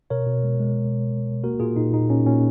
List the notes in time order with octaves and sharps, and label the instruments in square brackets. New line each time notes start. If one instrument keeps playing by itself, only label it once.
[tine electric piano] B2 A#4 C#5
B2
G#3
G#3
B2
B2
B2
B2
A#3 F#4 A#4
A#2 F4 G#4
A#2 D#4
A#2 D#4
A#2 C#4
A#2 C#4